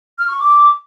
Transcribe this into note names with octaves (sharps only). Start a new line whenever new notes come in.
F6
C#6
D6